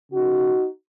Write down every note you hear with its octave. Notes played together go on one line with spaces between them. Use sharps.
C#3 F3 A#3 D#4 F#4